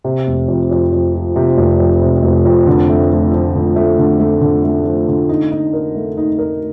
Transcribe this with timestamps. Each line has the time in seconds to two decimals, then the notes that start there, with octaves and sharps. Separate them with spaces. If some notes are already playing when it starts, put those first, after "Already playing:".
0.04 C3
0.27 F1
0.48 F2
0.71 F2
0.92 F2
1.14 F3
1.36 C3
1.57 F1
1.80 F2
2.02 C3
2.23 F1
2.45 F2
2.67 D3
2.89 A3
3.11 F3
3.32 F3
3.55 D3
3.76 A3
3.99 D3
4.20 A3
4.41 D3
4.64 A3
4.85 F3
5.08 D3
5.29 D#4
5.51 D#4
5.73 A#4
5.95 A3
6.17 D#4
6.38 A#4